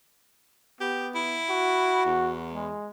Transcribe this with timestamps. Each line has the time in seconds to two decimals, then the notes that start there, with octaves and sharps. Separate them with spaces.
0.81 B3 G4
1.15 E4
1.50 F#4
2.06 E2
2.54 G#3